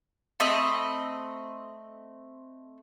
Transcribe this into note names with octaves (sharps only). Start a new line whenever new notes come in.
A3 C4 D#5 B5